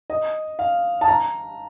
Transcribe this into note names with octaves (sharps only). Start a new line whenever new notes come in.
D#5
F5
A5
A#5